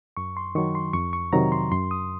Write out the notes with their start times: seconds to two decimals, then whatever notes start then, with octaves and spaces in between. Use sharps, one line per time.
0.17 F#2 C#6
0.37 C6
0.55 D#3 F#3 C#6
0.75 C6
0.93 F2 C#6
1.13 C#6
1.33 C3 D#3 F#3 A#5
1.52 C6
1.72 F#2 C6
1.91 D#6